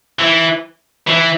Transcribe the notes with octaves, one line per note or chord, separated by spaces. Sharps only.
E3
E3